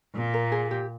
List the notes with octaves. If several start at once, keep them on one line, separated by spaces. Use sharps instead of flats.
A#2
A#4
G#4
G4